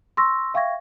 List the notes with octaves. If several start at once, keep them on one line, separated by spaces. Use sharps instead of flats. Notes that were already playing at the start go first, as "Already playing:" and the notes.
C6 C#6 E6 A#6
E5 F5 G5 C#6 G#6 A#6